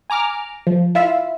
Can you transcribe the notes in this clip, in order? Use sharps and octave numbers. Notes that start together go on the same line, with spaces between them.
G#5 A#5 D6 F6
F3
E4 F4 E5 F5